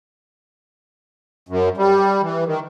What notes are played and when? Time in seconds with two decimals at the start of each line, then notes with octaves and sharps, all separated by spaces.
1.49 F#2
1.77 G3
2.22 E3
2.46 D#3